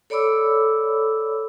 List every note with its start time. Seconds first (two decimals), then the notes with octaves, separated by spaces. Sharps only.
0.10 A4 C#5 D5 B5 D6 E6